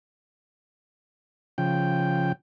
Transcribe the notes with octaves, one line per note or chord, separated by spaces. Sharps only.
C#3 F3 G5